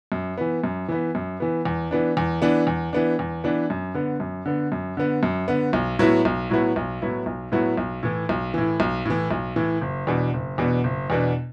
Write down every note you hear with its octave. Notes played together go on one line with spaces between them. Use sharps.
F#2
E3 B3
F#2
E3 B3
F#2
E3 B3
E2
E3 B3 D4
E2
E3 B3 D4
E2
E3 B3 D4
E2
E3 B3 D4
F#2
D3 B3
F#2
D3 B3
F#2
D3 B3
F#2
D3 B3
B1
A2 F#3 B3 E4
B1
A2 F#3 B3 E4
B1
A2 F#3 B3 E4
B1
A2 F#3 B3 E4
B1
A2 E3
B1
A2 E3
B1
A2 E3
B1
A2 E3
F#1
E2 B2 B3 D4
F#1
E2 B2 B3 D4
F#1
E2 B2 B3 D4